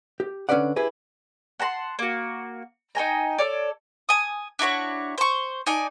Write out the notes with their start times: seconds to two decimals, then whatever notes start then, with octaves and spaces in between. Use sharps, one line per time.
0.20 G4
0.49 D3 C#4 A4 B4 D5 F#5
0.76 E4 G4 G#4 B4
1.60 F#5 A5 A#5 C6
1.99 A#3 F#4
2.95 D#4 G5 G#5 A#5
3.39 A4 C#5 D5
4.09 G#5 D#6
4.59 D4 E4 F#4 C#5
5.18 C5 C#6
5.66 D#4 D5 G#5